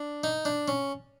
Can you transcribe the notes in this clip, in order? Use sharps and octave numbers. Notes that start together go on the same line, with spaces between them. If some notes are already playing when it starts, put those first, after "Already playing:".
Already playing: D4
D#4
D4
C#4